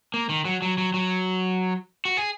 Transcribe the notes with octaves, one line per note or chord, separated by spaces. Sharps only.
A#3
D#3
F#3
F#3
F#3
F#3
F#4
G#4